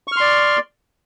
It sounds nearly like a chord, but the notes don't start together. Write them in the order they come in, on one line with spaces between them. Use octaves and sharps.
C#6 F6 C6 D5